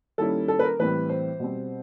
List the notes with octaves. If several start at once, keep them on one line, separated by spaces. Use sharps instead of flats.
D#3 G3 A#3 C#4 E4 A4
A4
B4
A#4
A2 E3 G3 C4 B4
C5
B2 G3 C4